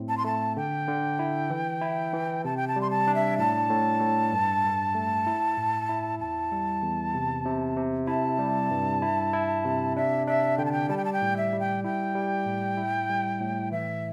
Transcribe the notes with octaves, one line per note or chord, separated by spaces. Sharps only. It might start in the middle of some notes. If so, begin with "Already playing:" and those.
Already playing: A2 C4
A5
C6
A3 A5
D3 G5
D3
E4
E3
E4
E3
C3 A5
G5
A5
G3
C6
A5
D4
E5
A2 A5
A2
A2
G2
G2
A3
E4
A2
E4
E2 A5
G3
E2
C3
C3
C3
E4 A5
G3
G2
E4
E4
C3
D4 E5
D4 E5
D3 G5
A5
G5
G3 A5
G5
A5
G5
A2
E5
G3
G5
E4 G5
G3
A2
E4
G3
A2
E3 E5